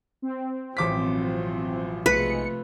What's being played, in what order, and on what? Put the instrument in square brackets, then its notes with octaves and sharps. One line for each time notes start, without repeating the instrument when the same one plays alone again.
[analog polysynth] C4
[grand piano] A1 D6 B6 [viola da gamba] B2 F3 F#3
[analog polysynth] B1 G#3 C#7 [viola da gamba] C3 F3 A3 [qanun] B4